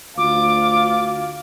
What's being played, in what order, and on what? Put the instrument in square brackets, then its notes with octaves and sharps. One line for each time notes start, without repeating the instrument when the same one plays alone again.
[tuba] D2 [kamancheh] F4 [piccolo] D6